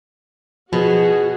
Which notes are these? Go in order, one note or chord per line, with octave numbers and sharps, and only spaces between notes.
B2 F3 F#4 G#4